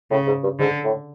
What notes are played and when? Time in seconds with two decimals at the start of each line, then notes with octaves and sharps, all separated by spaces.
0.11 A2 C#3
0.27 G#2
0.43 G2
0.59 G#2 D3
0.84 A2